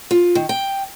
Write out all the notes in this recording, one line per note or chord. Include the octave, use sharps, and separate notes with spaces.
F4
D#3
G5